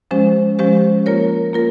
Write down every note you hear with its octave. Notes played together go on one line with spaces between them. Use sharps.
F3 G#3 C#4 G4 C5
F3 G#3 C#4 G4 C5
A#3 F4 A#4 C#5
A#3 F4 A#4